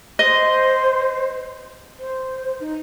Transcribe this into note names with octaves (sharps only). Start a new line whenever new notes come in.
C5 D#5
C5
D#4